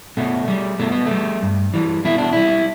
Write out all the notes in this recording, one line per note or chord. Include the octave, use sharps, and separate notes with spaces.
B2 A3
G3
B2 A3
B3
A3
G3
G2
E3 G3
B2 E4
D4
G3 E4